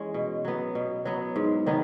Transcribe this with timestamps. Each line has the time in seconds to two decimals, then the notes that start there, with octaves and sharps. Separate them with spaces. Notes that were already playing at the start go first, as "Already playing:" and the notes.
Already playing: E3 G#3 C#4
0.14 B2
0.45 F#3 B3
0.75 B2
1.05 F#3 B3
1.36 G#2
1.66 D#3 F#3 B3